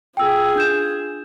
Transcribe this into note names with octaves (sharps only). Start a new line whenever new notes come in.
F4 G#4 G5 E6
D4 G6 E7